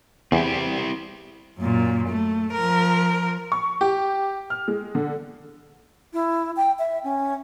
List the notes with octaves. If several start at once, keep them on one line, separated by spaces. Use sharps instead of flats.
E2 C4 E4 G4
F#2 A#2
A3
F3 A#4
C#6
G4
F6
G#3
D3
E4
G5
E5
C#4